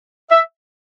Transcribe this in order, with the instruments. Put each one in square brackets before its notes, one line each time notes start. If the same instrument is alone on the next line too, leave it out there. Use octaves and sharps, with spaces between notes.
[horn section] E5